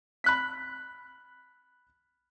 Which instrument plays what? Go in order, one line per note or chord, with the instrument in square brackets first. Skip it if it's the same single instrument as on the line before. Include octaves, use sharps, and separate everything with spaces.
[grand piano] B5 F#6 B6